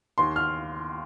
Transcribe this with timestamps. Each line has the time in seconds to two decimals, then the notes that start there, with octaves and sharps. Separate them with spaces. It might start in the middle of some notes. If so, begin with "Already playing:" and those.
0.18 D#2 C6
0.36 F6